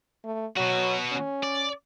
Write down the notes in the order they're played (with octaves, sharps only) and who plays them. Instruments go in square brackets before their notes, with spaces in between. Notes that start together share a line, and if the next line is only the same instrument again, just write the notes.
[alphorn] A3
[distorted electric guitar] B2 F#4 [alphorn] F#3
[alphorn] C#4
[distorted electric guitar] D5